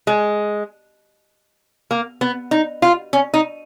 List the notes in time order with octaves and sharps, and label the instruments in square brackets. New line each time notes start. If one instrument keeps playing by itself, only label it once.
[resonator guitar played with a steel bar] G#3
A#3
B3
D#4
F4
C#4
D#4